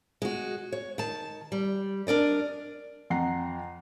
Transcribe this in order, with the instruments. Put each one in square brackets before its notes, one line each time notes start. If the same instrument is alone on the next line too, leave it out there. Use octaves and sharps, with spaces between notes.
[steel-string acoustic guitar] G#3 F#4
C#5
D#3 A5
G3
D4 A#4 D5 D#5
[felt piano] F2 F#5 A#5 C7